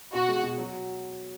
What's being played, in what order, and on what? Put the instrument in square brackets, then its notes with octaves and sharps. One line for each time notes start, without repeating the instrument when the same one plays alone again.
[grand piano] B2 [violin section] F#4
[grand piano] G#3
B2
F#3